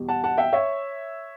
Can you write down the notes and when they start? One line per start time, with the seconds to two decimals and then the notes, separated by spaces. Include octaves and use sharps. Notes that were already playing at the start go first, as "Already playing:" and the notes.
Already playing: E2 B2 G3
0.09 F#5 A5
0.24 F#5 A5
0.38 E5 G5
0.53 C#5 E5